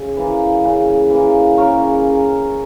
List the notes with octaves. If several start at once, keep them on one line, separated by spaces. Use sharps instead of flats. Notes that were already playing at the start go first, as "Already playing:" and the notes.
Already playing: C#3
E3 A#3
C#3
E3 A#3
C#3 A#4 C#5